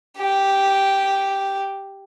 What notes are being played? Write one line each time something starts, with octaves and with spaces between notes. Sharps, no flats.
G4